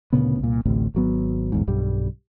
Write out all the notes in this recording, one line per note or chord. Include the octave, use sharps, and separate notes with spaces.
D2 A#2 C#3 B3
C2 A#2
A1 D2 A2 C3
G#1 F#3 B3
A#1 E2 G#2
B1 G2 G3